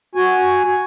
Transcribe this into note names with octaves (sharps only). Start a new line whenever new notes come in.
F#4 G#5